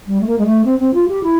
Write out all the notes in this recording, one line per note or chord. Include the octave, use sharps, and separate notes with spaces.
G3
A3
A#3
G#3
A3
C4
C4
F4
G4
E4